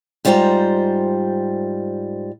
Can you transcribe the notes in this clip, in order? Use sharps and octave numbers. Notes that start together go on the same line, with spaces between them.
G#2 G3 F4 C5 G5 A#5